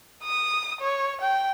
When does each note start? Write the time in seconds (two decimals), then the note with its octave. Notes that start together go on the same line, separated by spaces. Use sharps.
0.24 D#6
0.81 C#5
1.21 G5